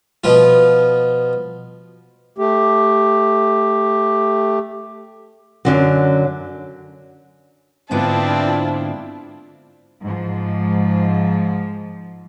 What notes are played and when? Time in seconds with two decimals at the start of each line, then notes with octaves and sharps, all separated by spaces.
0.24 B2 F3 F4
2.38 A3 G4
5.65 F#2 D3 F#3
7.91 G#2 D3 B3 C4 D4 E4 F4 A5
10.02 G#2 F3